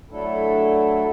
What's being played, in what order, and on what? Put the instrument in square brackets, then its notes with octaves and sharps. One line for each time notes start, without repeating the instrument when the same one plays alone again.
[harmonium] F#3 A3 D4 E4 A4